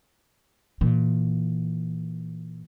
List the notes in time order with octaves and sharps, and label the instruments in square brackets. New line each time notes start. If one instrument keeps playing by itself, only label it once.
[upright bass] A#2 E3